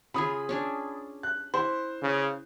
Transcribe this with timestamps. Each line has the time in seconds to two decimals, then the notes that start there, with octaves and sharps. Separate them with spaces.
0.14 C#3 F4 G#4 B5 D#6
0.49 C#4 D4 G#4
1.23 F#6
1.54 E4 C5
2.02 C#3